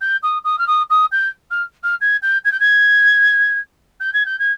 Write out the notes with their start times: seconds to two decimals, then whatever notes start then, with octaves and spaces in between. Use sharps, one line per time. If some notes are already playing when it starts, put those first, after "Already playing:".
0.01 G6
0.23 D#6
0.44 D#6
0.58 F6
0.67 D#6
0.90 D#6
1.12 G6
1.50 F6
1.83 F6
2.01 G#6
2.22 G6
2.44 G#6
2.52 G6
2.60 G#6
4.00 G6
4.13 G#6
4.26 G6
4.39 G#6